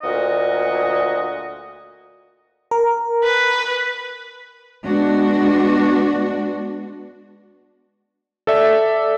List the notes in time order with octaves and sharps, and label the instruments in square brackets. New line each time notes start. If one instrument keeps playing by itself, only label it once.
[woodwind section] D2 A#2 F#4 D#5
[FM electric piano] A#4
[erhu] B4
[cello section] G#3 B3 D4 F#4
[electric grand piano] A4 D5 E5